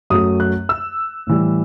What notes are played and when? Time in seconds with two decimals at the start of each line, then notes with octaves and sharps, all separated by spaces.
0.10 F#2 F#3 A3 D#6
0.40 F#6
0.69 E6
1.27 A2 E3 G3